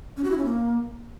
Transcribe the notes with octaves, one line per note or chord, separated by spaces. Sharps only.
C#4
F#4
E4
C#4
A#3